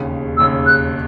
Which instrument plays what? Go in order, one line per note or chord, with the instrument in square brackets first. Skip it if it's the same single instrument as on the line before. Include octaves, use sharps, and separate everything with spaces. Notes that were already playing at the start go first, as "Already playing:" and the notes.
Already playing: [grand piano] E1 D#2 C#3
[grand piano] E1 D#2 C#3 [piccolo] E6
[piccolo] F#6